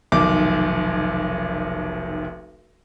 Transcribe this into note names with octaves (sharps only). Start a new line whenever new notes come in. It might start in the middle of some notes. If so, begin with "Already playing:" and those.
F1 B1 D#3 D6